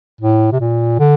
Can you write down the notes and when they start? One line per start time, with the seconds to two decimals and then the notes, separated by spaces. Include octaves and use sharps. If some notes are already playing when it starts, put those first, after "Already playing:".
0.21 A2
0.52 C3
0.60 A#2
0.99 D3